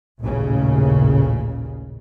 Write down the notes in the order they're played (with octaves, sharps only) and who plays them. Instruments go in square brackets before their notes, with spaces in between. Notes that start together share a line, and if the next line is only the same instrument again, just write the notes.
[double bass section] A1 D#2 A#2 C#3